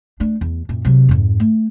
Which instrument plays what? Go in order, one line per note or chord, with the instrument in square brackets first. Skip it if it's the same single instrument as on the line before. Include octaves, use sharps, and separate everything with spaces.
[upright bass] A3 D4
E2
F#2 A#2
C3 F#3
F2 G#2
A3